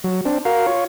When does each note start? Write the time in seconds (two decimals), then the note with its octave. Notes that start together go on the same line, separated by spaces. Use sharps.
0.04 F#3
0.25 C4 D4
0.45 F#4 A#4 F5
0.67 F4 C#5